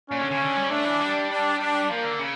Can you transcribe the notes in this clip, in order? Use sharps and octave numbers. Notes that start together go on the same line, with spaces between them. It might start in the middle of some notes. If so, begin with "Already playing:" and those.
A#2 C#4
D3
D3
C#3
D3
G3
A3 D4
E3
G3
D4
D4
F3 A#3
D3
C#3